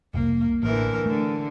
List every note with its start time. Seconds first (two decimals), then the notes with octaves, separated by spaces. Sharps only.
0.14 F1 C2 A#3
0.63 A1 D3 E3 A#4
1.06 D3 A3